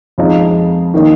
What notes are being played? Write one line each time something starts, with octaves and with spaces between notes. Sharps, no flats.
F2 F3 G#3 D#4
D#3 A#3 D#4